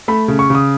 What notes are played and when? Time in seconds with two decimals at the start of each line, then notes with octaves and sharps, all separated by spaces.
0.08 A3 B5
0.28 C#3
0.39 C#6
0.50 C#3 D#6